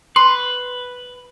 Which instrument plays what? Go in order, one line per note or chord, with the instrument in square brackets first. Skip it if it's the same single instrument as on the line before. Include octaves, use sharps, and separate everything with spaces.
[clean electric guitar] B4 [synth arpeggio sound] C6